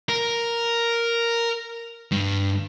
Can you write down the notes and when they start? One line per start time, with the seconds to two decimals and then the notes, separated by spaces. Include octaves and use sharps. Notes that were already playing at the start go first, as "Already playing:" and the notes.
0.09 A#4
2.12 G2